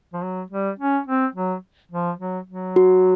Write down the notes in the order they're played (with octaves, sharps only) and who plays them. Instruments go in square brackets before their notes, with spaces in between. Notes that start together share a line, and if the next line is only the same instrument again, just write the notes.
[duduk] F3
F#3
G3
C#4
C4
F#3
F3
F#3
F#3
[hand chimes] F#4